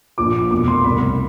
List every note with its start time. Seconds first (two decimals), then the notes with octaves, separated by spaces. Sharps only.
0.18 A#1 A#2 F3 D6
0.51 F1 E2 B2 D6
0.68 C6
0.84 C2 B2 B5